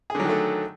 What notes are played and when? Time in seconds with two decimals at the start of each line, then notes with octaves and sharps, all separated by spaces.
0.10 G#4
0.15 D3
0.20 F#3
0.24 D#3
0.29 A3